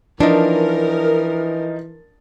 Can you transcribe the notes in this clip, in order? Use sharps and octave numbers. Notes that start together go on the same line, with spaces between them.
E3 F3 D4 D#4 A#4